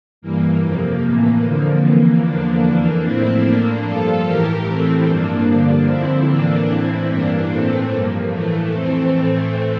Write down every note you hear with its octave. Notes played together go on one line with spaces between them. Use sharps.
G2 E3 A#3
F2 C3 F3
A2 E3
F2 D3 F3
F2 E3 A#3
E2 D3 F3 A#3 D4
F2 E3
A2 F3 C4 E4
A2 F3 A#3 D4
G2 F3 F4 A4
A2 E3 G4 A#4
A2 E3 A3 C4
G2 F3 A#3 D4
G2 D3 F3 A#3 D4
F2 D3 F3 C4 E4
A2 E3 A#3 D4
A2 E3 C4 E4
G2 E3 A#3 D4
A2 E3 A3 C4
G2 F3 A#3
A2 E3 A3
F2 E3 A3 C4
A2 E3